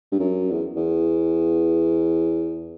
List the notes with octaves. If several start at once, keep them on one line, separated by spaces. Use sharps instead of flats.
G2
F#2
E2
E2